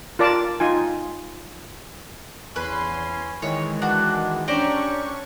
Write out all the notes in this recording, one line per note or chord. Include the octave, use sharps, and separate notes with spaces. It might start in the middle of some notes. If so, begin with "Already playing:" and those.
F4 A#4 D5 A5 D6
D#4 F4 G#5
E2 C#4 B4 C6
D#3 E3 G#3 C#5
D4 F#4
C#4 D4 G4 C5 D5 A#5 C#6